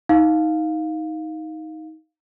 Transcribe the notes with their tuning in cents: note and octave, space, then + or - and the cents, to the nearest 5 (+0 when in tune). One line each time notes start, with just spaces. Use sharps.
D#4 +20 F5 +10